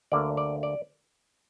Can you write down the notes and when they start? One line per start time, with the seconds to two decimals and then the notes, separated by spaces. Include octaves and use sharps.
0.12 D2 D3 A#3 D5
0.37 D5
0.63 D5